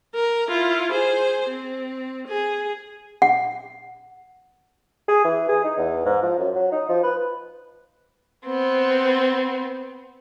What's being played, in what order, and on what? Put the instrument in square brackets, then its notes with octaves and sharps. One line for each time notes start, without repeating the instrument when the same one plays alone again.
[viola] A#4
E4 F4
G#4 C5
C4
G#4
[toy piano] F#5
[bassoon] G#4
E3
G#4
D#4
E2
G#2
F3
F#2
F#3
D#4
F3
B4
[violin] B3 C4